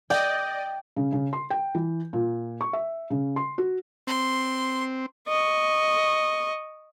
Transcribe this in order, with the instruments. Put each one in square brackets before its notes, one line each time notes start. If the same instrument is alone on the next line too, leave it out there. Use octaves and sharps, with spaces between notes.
[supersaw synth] D5 D#5 [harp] G5
[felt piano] C#3
C#3
C6
G5
E3
A#2
C#6
E5
C#3
C6
F#4
[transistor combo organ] C4 [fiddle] C6
[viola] D#5 C#6